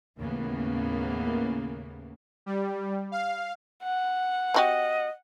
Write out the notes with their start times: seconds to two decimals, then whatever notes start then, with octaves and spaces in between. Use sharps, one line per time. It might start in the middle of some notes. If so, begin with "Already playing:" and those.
0.18 D#2 A2 C#3 E3 A#3 B3
2.46 G3
3.12 F5
3.83 F#5
4.54 C4 F#4 G4 D#5